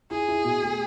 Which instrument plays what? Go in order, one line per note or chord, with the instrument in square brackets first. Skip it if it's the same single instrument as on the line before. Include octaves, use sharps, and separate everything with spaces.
[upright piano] E4 [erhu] G#4
[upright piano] E4
B2
A3